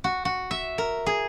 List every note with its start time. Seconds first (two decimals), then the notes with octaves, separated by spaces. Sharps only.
0.04 F#4
0.25 F#4
0.51 E5
0.78 A#4
1.06 G#4